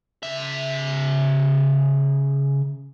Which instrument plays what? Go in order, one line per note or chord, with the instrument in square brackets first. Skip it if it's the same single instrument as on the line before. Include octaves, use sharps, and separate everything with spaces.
[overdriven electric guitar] C#3 E5